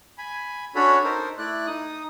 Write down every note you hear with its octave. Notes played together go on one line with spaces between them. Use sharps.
G#5 B5
C#4 D4 F#4 A4 C#5 B5
D#4 A4 A#4 C5
A3 E4 D5 F#6
D#4 D#6